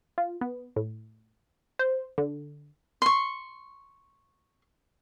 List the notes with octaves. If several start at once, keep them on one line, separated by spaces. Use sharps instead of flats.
F4
B3
A2
C5
D3
C6 C#6